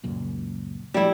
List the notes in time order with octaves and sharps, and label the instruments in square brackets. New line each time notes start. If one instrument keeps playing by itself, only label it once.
[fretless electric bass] C#2 F#2 A#2
[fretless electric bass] F3 A3 [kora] G3 E4